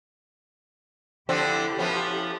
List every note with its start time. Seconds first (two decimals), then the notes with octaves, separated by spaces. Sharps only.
1.29 D3 F3 C4 E4 G4 A4
1.78 F3 B3 C#4